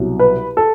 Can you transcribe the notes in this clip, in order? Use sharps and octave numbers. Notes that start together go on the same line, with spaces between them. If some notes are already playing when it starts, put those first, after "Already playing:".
Already playing: C2 B2 F#3
B4
A4